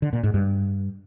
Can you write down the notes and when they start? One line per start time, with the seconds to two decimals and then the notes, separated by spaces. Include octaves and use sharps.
0.02 D3
0.13 A#2
0.23 G#2
0.34 G2